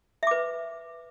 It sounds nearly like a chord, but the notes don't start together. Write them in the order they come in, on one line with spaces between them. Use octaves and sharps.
E5 D6 B4